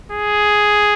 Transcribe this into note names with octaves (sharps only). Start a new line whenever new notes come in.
G#4